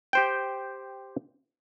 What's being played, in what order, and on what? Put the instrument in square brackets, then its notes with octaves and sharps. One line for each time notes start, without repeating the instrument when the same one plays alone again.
[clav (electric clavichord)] G4 C5 G5